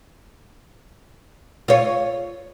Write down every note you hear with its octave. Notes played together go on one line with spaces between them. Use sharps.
F4 C#5